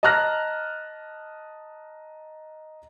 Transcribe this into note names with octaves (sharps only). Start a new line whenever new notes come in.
D#5 A5 A#5 F6 F#6 A#6